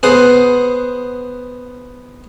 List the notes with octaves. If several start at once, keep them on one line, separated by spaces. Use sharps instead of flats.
B3 G#4 C5 F#5